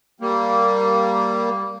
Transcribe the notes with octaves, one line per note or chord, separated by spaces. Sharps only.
G3 A#3